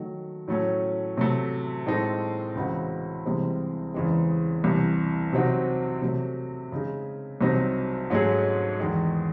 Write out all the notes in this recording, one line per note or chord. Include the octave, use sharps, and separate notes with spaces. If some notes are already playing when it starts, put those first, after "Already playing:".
Already playing: D#3 F#3 A3
A2 F#3 A3 C#4
C3 F#3 A3
A2 G#3 C4 D#4 A4
C#2 C#3 E3 C4 F#4
C2 C3 E3 G#3 C4
E2 C#3 E3 G#3 C4
C2 C3 E3
C3 F#3 C4 D#4 F#4
C3 F#3 A3
C#3 G#3 D#4 G#4
C2 C3 F#3 C4 D#4
G#2 F#3 A3 C#4 G#4
E2 D#3 G#3